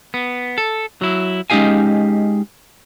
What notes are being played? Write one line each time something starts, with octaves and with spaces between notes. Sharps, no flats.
B3
A4
F#3 E4
G#3 C#4 D#4 G4 F5 G#5